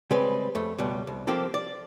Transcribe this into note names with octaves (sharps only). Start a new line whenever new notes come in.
C#3 G3 G#3 C4 B4
F2 A3
C#2 B2 G3
C2
F3 A#3 C4 F4 G4 A4
D5